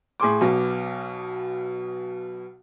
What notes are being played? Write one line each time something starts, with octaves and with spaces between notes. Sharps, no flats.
A2 G#4 C6 D6
B1 B2